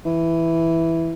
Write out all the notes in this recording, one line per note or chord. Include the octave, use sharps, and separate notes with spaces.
E3